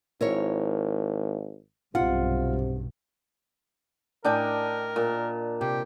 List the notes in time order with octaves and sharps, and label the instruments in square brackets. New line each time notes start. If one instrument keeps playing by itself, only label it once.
[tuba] G#1 [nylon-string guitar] E4 A#4 C#5
[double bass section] B1 G2 [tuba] C3 [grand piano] F4 [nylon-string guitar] F#5
[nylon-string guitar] A2 D5 G#5 [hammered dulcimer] D4 D#5 G5 [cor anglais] A#4
[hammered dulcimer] A#2
[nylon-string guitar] C3 [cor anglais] G4